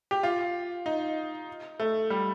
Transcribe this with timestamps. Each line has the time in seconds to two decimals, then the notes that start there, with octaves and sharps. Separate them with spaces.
0.11 G4
0.23 F4
0.86 D#4
1.80 A3
2.10 G3